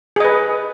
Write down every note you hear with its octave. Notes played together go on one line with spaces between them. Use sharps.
G#4 B4 D#5